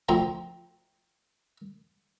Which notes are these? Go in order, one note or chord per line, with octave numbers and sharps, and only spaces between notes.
D2 F3 C4 A#5 C6